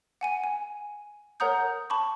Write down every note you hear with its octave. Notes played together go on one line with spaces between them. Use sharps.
F#5 G#5 D#7
G#5
A#4 C#5 F#5 A#5 D#6 G6
A5 B5 C#6 D6